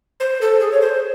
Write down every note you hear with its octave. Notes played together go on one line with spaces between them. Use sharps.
C5
A4
G#4
C#5
C5